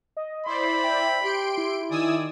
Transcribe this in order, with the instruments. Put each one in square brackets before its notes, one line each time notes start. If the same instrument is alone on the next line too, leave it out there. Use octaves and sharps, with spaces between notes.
[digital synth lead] D#5
[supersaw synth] E4 C5 D5 [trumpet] B5 [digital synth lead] C6
[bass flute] E5 [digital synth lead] G5
[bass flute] G4 [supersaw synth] C6 D7
[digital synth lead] E4
[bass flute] D#3 [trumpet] D5 [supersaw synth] G#5 D#6 E6